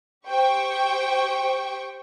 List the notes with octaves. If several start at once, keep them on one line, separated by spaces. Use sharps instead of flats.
G4 C5 G5 C#6